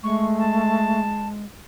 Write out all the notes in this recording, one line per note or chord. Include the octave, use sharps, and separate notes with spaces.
G#3 A3 C#6
A5